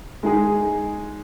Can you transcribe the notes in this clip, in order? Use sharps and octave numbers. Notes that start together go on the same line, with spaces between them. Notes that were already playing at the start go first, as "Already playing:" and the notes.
G#3 D#4 G#4